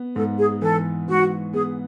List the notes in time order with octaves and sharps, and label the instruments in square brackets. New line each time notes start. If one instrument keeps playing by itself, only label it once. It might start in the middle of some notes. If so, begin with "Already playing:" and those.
Already playing: [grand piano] B3
[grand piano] G#2 [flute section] A4
[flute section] G#4
[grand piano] E3 [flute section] A4
[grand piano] G#2 [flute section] F#4
[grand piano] B3 [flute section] G#4